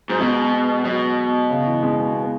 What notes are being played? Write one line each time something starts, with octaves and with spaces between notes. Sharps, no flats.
G#2 F#3
B2 G#3
B2 F#3
C#3
E3
G#3
B3